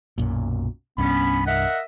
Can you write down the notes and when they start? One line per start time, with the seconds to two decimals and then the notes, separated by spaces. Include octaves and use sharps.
0.18 B1 F#2 A#2
0.98 C2 G2 B3 C#4 B5
1.47 A#4 D#5 E5 F#5